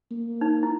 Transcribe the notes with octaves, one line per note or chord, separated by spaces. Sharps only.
A#3
D#4
E4